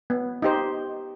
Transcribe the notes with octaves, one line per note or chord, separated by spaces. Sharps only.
B3
D#4 G4 C5